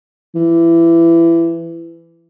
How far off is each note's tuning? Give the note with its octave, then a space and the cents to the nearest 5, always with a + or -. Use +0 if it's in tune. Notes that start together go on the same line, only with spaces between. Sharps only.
E3 +20